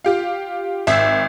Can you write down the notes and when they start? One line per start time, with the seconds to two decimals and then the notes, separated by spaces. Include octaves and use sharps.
0.04 F4 G4 F5
0.87 G#1 E5